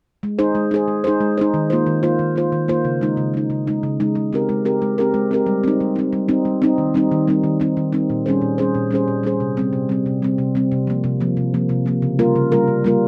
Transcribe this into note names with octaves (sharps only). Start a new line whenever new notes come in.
G#3
D#4 G#4 C5
G#3
D#4 G#4 C5
G#3
D#4 G#4 C5
G#3
D#4 G#4 C5
D#3
A#3 F4 C5
D#3
A#3 F4 C5
D#3
A#3 F4 C5
D#3
A#3 F4 C5
C#3
G#3 D#4
C#3
G#3 D#4
C#3
G#3 D#4
C#3
G#3 D#4
G#3
C4 G4 A#4
G#3
C4 G4 A#4
G#3
C4 G4 A#4
G#3
C4 G4 A#4
G3
C4 D#4
G3
C4 D#4
G3
C4 D#4
G3
C4 D#4
D#3
G3 C4 D#4
D#3
G3 C4 D#4
D#3
G3 C4 D#4
D#3
G3 C4 D#4
A#2
G3 C#4 G#4 C5
A#2
G3 C#4 G#4 C5
A#2
G3 C#4 G#4 C5
A#2
G3 C#4 G#4 C5
C3
G3 C4
C3
G3 C4
C3
G3 C4
C3
G3 C4
C3
F3 A#3
C3
F3 A#3
C3
F3 A#3
C3
F3 A#3
C#3
G3 A#3 F4 A#4
C#3
G3 A#3 F4 A#4
C#3
G3 A#3 F4 A#4